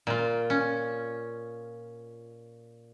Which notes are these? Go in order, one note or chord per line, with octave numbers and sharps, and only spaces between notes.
A#2 F4
C#4